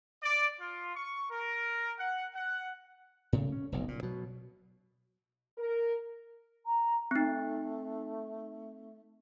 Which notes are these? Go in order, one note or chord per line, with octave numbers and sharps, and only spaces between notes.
D5
F4
C#6
A#4
F#5
F#5
A2 C#3
C#4
F1 B1
A#2
B2 F#3
A#4
A#5
A3 C4 D#4